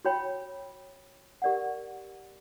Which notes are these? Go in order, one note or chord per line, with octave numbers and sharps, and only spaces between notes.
F#4 C#5 G5 B5
G4 A#4 D5 F#5